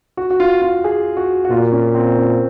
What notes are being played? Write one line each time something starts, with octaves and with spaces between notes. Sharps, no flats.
F#4
F#4
F4
F4
G#4
F#4
F#4
A#2 F4
C#4
C4
C#4